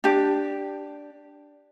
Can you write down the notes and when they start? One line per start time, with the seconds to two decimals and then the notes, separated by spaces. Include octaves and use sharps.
0.04 D4 G4